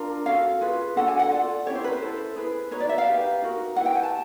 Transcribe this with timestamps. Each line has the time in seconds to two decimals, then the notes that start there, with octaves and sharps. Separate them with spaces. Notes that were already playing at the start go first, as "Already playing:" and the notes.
Already playing: D4 F4 A#4
0.26 C#4 F#4 A4 F5
0.61 F4 G#4 B4
0.96 D4 F#4 A4 F#5
1.08 G#5
1.19 F#5
1.31 F4 A4 D5
1.66 C#4 E4 G4 C#5
1.75 C5
1.84 B4
1.93 C5
2.01 E4 A4
2.36 E4 G#4 B4
2.71 D#4 F#4 B4 C#5
2.80 D5
2.89 E5
2.98 F5
3.07 D#4 G4 B4
3.42 D#4 F#4 A#4
3.76 E4 G4 B4 F#5
3.86 G5
3.95 G#5
4.03 A5